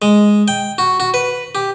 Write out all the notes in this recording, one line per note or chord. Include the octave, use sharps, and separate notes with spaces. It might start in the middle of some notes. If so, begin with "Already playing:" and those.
G#3
G5
F#4
F#4
B4
G4